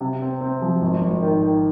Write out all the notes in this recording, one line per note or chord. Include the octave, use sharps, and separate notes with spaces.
C3
C4
C4
F3
G#1
G#1
D#3
D#3